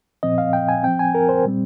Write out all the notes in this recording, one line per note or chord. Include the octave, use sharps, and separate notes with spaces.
A#2 F3 C4 D#5
F5
G5
G#5
F3 C4 G5
G#5
A#4
C5
A#2 G3 C4